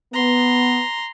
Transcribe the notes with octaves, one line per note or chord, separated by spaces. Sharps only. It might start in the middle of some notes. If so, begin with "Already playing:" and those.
B3 A#5 C6